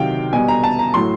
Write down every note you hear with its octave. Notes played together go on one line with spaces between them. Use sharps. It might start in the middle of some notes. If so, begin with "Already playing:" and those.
Already playing: C3 D#3 F#3 F5 G5
B2 G3 G#5
A#5
A5
A#5
A2 F#3 C6